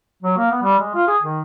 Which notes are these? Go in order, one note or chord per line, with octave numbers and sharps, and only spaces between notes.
F#3
A#3
B3
G3
G#3
F4
G#4
D#3